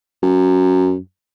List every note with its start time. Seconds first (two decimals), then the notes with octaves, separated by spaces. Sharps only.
0.23 F#2